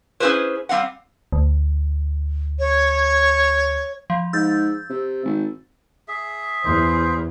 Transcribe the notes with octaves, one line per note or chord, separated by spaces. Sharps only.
C#4 E4 G4 G#4 B4 C5
G3 C4 F5 F#5
D2
C#5
F3
G#2 E6 G6 A6
C3
G#1
G#4 E5
E2 C5